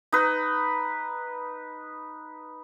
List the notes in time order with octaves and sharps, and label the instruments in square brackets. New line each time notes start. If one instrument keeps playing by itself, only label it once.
[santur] D#4 B4